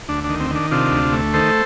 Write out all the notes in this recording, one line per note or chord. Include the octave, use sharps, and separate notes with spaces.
D2 D4
D4
D#3
C4
D#3
D4
C3 D4 F4
D2
A3
D#3 A4 C5